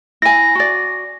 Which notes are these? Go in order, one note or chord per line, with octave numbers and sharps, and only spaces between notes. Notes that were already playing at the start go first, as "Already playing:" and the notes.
E4 G#5 A#6
F#4 D5